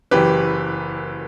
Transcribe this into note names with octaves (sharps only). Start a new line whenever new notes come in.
F#1 F#2 E3 G4 B4